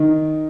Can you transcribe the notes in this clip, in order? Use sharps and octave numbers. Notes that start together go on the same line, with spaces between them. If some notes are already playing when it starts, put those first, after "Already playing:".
Already playing: D#3